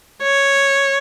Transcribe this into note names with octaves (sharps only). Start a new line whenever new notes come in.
C#5